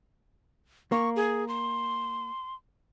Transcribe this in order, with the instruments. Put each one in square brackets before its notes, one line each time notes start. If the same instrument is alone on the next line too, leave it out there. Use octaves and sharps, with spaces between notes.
[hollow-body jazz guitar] A#3 [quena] C#6
[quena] G#4
C6